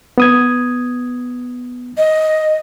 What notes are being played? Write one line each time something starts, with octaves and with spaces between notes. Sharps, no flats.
B3 D#6 G#6
D#5